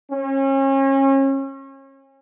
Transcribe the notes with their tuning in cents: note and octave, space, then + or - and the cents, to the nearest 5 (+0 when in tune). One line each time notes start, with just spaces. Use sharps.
C#4 -35